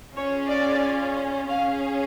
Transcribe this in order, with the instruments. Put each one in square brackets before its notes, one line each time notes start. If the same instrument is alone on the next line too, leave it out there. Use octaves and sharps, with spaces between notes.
[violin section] C#4 F4 G#4 C#5
D5
C#4 G#4 F5